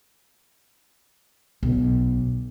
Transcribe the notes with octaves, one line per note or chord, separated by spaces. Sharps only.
B1